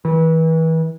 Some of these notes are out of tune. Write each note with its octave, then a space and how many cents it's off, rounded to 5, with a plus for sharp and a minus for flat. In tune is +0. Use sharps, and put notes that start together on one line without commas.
E3 -30